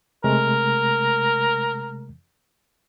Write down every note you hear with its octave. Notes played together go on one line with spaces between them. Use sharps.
C3 G#3 A3 A#4